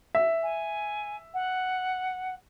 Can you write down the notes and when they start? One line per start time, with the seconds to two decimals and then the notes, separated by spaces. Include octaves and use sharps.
0.15 E5
0.42 G#5
1.34 F#5